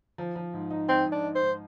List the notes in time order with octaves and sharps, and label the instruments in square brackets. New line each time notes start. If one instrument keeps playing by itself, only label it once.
[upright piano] F3
F3
G#2
D#4
[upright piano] G#2 [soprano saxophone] C4
[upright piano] G#2
[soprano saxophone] D4
[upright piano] D#4
[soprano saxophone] C5
[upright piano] G#2